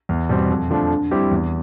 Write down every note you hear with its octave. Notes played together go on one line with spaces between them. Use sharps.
E2
B2 G3 C4
F2
D3 F3 A3 D4
D3
G3 C4 E4 G4
E2